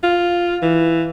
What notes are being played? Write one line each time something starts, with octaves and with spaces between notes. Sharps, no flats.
F4
E3